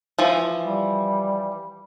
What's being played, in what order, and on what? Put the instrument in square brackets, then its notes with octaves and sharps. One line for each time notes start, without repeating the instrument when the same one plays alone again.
[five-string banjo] E3 F3
[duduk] G3